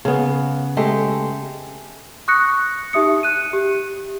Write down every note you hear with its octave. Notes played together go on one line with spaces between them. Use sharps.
C#3 B3
G#3 A3 G4
C#6 D#6 F#6 A#6 C#7
D#4 G4 E5 D#6 C#7
F#6 D#7
G4